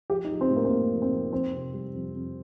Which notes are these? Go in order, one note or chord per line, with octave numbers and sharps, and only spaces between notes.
F3 G4
D#4
F3
C4
A2
A#3
C4
A2 A#3
F3
C4
F3
F2 C4
C3
G3
F2
F2